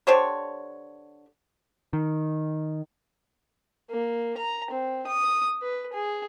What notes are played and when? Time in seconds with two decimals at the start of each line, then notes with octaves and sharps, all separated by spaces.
0.07 D3 G4 C5 C#5
1.93 D#3
3.90 A#3
4.38 A#5
4.71 C4
5.07 D#6
5.62 B4
5.93 G#4